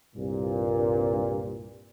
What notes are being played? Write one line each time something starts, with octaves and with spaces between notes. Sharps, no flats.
C2 G2 A#2